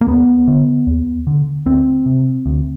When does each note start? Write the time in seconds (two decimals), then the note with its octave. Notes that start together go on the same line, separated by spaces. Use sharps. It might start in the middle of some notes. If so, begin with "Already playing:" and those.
0.01 A#3
0.07 D#2 B3
0.48 D3
0.87 D#2
1.27 D3
1.66 D2 C4
2.06 C3
2.46 D2